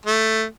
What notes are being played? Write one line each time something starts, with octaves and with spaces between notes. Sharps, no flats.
A3